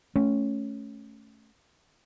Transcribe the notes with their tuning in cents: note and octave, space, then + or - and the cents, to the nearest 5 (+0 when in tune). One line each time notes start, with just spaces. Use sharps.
A3 -10 C#4 +0